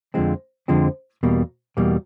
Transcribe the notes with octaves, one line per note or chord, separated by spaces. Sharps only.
F2 D3 F3 G#3 C4
F2 D3 F3 G#3 C4
E2 B2 G3 A#3
E2 B2 G3 A#3